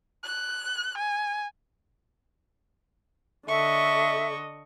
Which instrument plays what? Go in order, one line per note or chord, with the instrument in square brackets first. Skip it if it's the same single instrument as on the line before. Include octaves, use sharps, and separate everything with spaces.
[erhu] F#6
G#5
[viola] D3 D#5 [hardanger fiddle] A4 C#6 [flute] E5